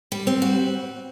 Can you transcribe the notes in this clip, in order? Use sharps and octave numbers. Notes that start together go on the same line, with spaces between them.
G3
C4
F#4